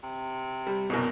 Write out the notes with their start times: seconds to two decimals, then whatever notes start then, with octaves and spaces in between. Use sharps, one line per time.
0.04 C3
0.67 G3
0.90 F#1 C2 B2 A#4